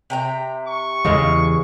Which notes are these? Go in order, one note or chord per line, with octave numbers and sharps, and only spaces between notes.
C3 G5 A#5
C#6
E2 C#3 E3 G#3 F5